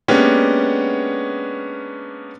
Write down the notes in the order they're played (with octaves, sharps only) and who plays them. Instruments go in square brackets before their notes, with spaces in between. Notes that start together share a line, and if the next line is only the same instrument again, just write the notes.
[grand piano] G#3 A#3 B3 C#4 D4 G4